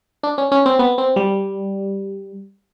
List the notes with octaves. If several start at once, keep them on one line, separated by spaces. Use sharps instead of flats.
D4
C#4
C#4
C4
B3
C4
G3